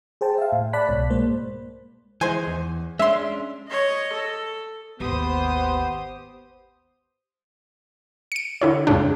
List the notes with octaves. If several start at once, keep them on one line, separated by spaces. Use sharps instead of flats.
G#4 C5 G5 A5
E5 F5
A2
D5 A5 B5 F#6 B6
C2 G#2 B2 C#5
G#3 A#3 C5
E3 G#3 D#4 C5 G#5
E2
G#3 C#4 D4 E5 C6
C#5 D#5
A4
G#1 D#2 B3 G4 C5 D#6
C#7 D7
D3 E4 C#5
F2 G#2 C#3 D4